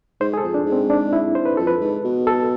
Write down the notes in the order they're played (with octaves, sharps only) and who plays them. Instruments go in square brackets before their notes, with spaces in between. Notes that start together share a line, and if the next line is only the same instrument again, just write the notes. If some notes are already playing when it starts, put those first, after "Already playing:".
[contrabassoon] G#2 [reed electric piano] C5
[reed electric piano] G#4
A4
[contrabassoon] F2
[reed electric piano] D4
[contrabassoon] G#2
[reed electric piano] C4
D4
E4
C5
B4
[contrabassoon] F2 [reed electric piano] A4
[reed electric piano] B4
[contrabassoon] G#2
B2
[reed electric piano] A4